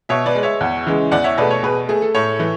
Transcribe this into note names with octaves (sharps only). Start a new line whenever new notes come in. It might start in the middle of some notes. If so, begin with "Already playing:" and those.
B2 C#5 E5
B4 D5
G#3
C#5 E5
E2
C#3 E3 G#3
E2 D5 F#5
C#5 E5
B2 A3 B4 D5
A4 C#5
B2 G#4 B4
A3 G#4
A4
A2 A4 C#5
E3